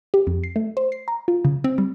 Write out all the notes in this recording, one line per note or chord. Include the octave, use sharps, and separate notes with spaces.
G4
F2
C7
A3
C5
C7
A#5
F4
C#3
C4
G3